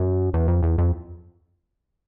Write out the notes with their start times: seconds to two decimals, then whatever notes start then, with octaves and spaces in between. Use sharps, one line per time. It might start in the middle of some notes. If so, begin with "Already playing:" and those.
Already playing: F#2
0.33 E2
0.48 F2
0.63 E2
0.78 F2